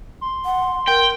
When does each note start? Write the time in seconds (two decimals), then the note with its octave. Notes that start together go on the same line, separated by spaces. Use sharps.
0.21 C6
0.45 F#5
0.88 A#4 G5